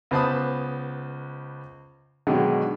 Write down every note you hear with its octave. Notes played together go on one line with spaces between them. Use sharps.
C#2 B3 C5 A5 B5 D#6
B2 D3 D#3 F#3 G#3